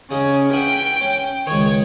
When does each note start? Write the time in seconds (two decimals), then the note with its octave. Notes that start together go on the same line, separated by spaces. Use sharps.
0.11 C#3 C#4 D#4
0.53 B4 E5 F#5 G5
1.01 C#4
1.47 C#2 D#3 C#5